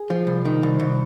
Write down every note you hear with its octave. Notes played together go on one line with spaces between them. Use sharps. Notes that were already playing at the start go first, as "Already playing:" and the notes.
Already playing: G#4
F3
C2
D#3
C2
C2